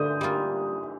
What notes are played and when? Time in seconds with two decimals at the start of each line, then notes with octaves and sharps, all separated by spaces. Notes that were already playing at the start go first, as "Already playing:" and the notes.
Already playing: D3 A3 D4 D#6 G6
0.21 G3 A#3 F4